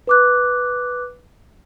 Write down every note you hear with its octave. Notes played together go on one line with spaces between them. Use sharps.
B4 D6 F#6